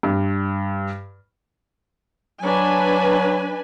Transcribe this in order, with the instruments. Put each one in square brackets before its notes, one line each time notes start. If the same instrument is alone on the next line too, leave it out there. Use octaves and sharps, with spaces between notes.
[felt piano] G2
[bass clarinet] F#3 [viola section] D4 B4 G#5